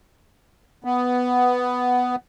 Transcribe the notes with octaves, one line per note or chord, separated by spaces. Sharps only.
B3